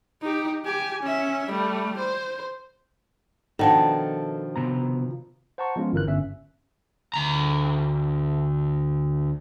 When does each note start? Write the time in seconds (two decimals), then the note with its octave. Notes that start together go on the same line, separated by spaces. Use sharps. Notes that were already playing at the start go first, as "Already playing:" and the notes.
0.22 D#4 G4
0.65 G4 G#5
1.03 C#4 E5
1.50 G3 A3
1.98 C5
3.59 B2 D#3 F3 D4 A4 D#5 F#5 A5
4.56 C3 B3 A#5
5.58 C5 F#5 A5 A#5 C#6
5.76 F3 G#3 B3 C#4 F4
5.93 G1 E3 A#4 F#6
6.07 G1 C#4 E5
7.14 D2 A#5